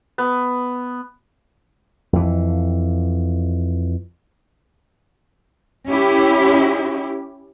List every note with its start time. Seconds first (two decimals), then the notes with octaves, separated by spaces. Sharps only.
0.18 B3
2.13 F2 E3
5.88 C#4 E4 G4